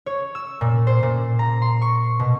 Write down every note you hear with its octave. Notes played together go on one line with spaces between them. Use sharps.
C#5
E6
A#2
C5
A#2
A#5
C6
C#6
B2